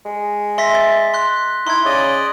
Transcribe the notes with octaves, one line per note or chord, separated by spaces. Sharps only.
G#3
E5 C6 A#6 B6
A6
C6 F#6
D#4 E4 C6 G#6
C#3 D5 D#5